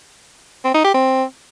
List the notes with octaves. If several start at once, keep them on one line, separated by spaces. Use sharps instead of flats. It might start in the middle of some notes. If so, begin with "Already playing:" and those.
C4
D#4
G4
C4